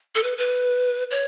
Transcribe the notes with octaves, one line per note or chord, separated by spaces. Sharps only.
A4
B4
B4
C#5